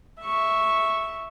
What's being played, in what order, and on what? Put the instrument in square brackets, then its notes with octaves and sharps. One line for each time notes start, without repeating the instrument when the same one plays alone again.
[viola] E5 C#6